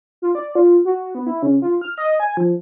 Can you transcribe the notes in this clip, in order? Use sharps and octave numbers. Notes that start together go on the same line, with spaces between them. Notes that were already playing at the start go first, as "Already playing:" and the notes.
F4
D5
F4
F#4
B3
E4
C#3
F4
F6
D#5
G#5
F3